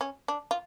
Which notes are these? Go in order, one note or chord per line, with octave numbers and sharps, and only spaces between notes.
C#4
D4
F4